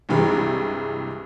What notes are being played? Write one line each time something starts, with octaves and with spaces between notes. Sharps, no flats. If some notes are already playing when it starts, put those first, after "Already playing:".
C2 G2 C3 E3 G3 G#3